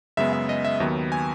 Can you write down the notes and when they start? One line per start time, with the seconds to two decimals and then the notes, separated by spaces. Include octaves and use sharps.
0.17 F#2 C#3 G#3 B3 E5
0.33 E5
0.49 D#5
0.65 E5
0.80 D#2 D#3 F#3 B3
1.12 G#5